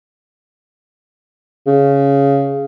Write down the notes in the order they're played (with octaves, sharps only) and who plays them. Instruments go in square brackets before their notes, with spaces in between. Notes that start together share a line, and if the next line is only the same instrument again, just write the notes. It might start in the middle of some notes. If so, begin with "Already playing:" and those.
[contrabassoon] C#3